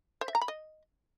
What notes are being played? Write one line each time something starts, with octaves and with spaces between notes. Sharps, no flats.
C5
E5
A#5
B5
D#5